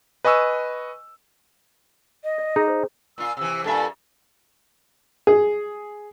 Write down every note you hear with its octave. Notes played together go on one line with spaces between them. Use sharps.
B4 D#5 G#5 C#6 E6
D#5
D5
D#4 G#4
C5
A#2 F4 E6
C3 E3 E6
G2 A#2 A4 E5
G#4